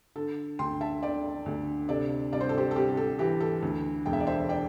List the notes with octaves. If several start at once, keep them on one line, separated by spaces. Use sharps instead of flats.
D3 A4
D2 G5 C6
E5 A5
D3 D5 G5
D2
C3 A4 D5
C2 D5
C5
A4
G4 C5
A4
C2 G4
A4
E3 G4
A4
D2
E1 G5
E5
D5
C5 E5
D5 G5